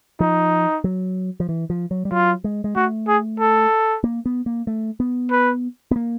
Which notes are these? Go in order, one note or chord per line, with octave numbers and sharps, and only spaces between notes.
F3 D#4
F#3
F3
E3
F3
F#3
G3
F#3 F4
G#3
G#3
A3 F#4
G#4
A4
A#3
B3
A#3
A3
B3
B4
B3
A#3